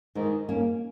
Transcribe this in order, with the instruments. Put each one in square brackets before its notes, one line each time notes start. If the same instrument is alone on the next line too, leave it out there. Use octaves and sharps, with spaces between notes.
[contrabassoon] G#2 [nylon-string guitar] D#3
[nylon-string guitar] A#3 C#4